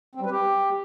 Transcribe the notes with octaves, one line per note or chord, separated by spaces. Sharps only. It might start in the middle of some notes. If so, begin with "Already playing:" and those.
C4
G3
B4
G4